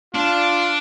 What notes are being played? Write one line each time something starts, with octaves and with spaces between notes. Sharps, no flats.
D4 F4